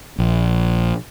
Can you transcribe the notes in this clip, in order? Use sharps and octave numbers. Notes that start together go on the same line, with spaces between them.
A#1